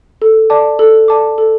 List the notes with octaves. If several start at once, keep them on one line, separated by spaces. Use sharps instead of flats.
A4
D5 A5 D6
A4
D5 A5 D6
A4